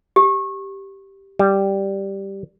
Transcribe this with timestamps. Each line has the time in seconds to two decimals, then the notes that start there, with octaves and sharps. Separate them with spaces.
0.16 G4
1.39 G3